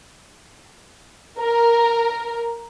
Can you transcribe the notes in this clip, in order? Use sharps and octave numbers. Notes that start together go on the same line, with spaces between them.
A#4